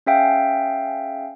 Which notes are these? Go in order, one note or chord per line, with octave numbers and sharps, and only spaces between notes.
C#4 G#4 E5 F5 G5 G#5